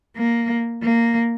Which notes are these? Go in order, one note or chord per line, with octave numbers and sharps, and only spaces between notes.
A#3
A#3